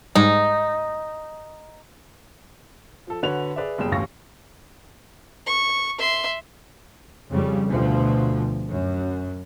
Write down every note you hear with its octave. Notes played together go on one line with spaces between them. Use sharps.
G#2 G3 D#4
F3 A4
D3 F#4 B4 C#5 F#5 F7
G#4 B4 D5 E5
F#1 B2 G3 G#4 G5 E7
D#1 A1 D2 F5 C#6 A#6
C#6
E5 C6
F2 C#3 G3
D2 B2 F3
F#2